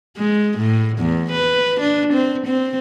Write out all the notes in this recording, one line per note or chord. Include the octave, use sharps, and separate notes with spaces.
G#3
A2
E2
B4
D4
C4
C4